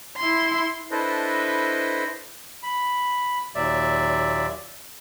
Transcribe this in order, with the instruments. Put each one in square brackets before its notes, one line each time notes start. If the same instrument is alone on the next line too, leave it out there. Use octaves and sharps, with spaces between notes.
[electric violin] E4 C6
[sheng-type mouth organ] D4 E4 A4 B4 C5 D#5
[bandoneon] B5
D#2 A#2 F#3 D5 E5